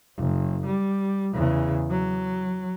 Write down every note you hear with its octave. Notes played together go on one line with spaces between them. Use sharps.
F#1
G3
E2 C#3
F#3